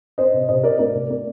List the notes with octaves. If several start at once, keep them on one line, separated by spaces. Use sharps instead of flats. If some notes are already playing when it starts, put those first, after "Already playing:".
C4 C5 D#5
C3
C3 C5 D#5
C4 A#4 D5
A3 A#4 D5
C3
A3 A#4 D5